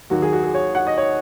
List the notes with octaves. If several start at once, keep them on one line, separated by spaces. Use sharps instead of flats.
D#2 D#3 F#3 F#4
G#4
F#4
G#4
C#5
F#5
D#5
C#5